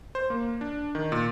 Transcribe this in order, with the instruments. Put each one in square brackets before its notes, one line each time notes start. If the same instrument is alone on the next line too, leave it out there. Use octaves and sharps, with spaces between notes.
[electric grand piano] C5
A#3
D4
D#3
A#2